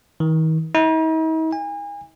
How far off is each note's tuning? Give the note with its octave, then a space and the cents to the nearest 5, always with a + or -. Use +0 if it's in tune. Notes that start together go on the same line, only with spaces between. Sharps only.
D#3 +40
D#4 +45
G#5 -35